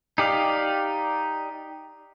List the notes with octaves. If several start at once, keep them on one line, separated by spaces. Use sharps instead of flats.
D#4 G4 D5 F5